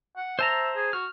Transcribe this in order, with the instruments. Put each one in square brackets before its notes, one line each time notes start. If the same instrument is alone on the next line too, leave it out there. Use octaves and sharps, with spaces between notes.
[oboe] F#5
[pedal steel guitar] C5 A5 A#5 [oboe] E5
[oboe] G#4
[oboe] F#4 [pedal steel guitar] F6